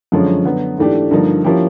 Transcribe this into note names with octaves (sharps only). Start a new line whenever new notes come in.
F#2 D3 F3 G#3 C#4
D3 F#3 B3
G#2 E3 A3 D4 G4
G2 D3 F3 A#3 D#4
F3 A#3 C#4 E4 G4